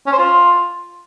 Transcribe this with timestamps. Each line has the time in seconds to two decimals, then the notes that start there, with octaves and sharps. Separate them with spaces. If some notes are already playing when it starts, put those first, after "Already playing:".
0.07 C#4
0.13 C5
0.18 F4